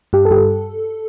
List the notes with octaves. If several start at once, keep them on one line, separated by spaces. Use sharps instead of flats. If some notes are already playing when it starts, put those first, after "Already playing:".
G2 G4
A4
G2 G4
A4